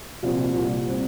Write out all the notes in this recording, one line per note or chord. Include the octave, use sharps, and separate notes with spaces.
C2 A#2 F3 C4 F4
C2 A#2 G3
G3 C4